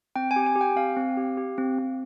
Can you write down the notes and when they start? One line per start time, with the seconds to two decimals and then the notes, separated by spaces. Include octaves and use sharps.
0.16 C4 G5
0.31 G#5
0.36 G4
0.46 G#5
0.56 G4
0.61 G5
0.76 C4 F5
0.97 C4
1.17 G4
1.37 G4
1.58 C4
1.79 C4